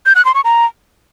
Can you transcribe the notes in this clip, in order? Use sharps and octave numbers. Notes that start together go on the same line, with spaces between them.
G6
F#6
C6
C#6
A#5